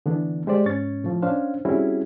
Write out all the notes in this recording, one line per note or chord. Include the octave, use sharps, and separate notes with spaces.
D3 E3 A3 B3 D4
G#3 G4 C5 D5
G#2 C#4 C#6 A6
A2 F3
C#4 D4 C5 F5
G3 C4 C#4 E4 F#4 G#4